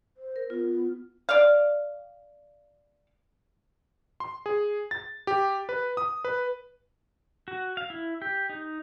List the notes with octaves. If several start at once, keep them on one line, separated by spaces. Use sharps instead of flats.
C5
A#4
B3 F4
D5 F5
C6
G#4
A6
G4
B4
D#6
B4
F#4
F5
E4
G4
D#4